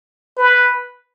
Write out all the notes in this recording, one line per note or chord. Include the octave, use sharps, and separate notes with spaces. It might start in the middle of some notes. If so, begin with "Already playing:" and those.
B4